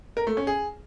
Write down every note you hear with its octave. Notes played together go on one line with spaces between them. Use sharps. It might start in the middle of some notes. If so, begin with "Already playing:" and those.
A#4
A3
C#4
G#4